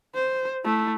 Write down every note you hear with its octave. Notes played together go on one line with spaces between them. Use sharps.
C5
A3 E4